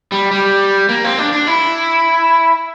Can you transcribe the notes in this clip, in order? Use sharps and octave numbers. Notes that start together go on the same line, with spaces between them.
G3
G3
A#3
C4
D4
D4
E4